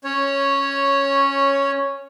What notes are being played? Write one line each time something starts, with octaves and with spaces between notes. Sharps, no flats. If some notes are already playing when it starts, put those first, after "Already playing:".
C#4 C#5